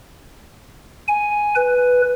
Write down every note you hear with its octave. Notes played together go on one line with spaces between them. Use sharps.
G#5
B4